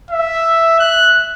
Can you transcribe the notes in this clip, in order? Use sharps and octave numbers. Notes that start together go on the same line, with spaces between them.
E5
F#6